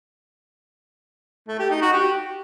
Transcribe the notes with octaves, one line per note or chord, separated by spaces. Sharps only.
A3
G4
D#4
F#4
G4